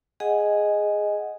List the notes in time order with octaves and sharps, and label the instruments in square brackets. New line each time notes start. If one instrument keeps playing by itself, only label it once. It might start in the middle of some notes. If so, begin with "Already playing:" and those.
[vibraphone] G#4 D#5 F#5 G#5